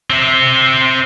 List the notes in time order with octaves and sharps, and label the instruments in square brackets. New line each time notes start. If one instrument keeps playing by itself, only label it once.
[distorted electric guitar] C4 E5